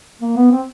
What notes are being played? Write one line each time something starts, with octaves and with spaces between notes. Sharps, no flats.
A#3
B3
C4